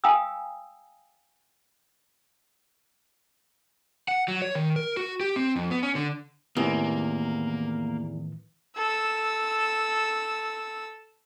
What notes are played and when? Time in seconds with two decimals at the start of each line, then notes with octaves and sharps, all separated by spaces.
0.04 F5 G5 G#5 A#5 D#6 E6
4.08 F#5
4.28 F#3
4.42 C#5
4.55 D#3
4.76 A#4
4.97 F#4
5.20 G4
5.36 C4
5.56 F2
5.71 B3
5.83 C#4
5.95 D3
6.57 E2 A2 C3 D#3 E3 A#3
8.78 A4 E6